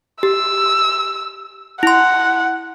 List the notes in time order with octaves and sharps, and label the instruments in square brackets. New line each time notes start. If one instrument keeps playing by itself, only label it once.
[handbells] G4 [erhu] E6
[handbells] E4 C6 [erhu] F#5